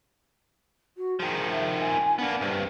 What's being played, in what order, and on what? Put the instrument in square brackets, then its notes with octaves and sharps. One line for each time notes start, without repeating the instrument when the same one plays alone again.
[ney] F#4
[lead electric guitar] D#3 F3 [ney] G#4
[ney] E5
G#5
[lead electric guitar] A#3 B3 [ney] D4
[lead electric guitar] C2 G2